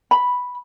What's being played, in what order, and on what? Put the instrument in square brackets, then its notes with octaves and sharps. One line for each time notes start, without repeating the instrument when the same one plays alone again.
[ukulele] B5